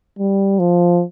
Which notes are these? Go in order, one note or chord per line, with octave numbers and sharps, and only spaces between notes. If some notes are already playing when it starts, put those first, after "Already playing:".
G3
F3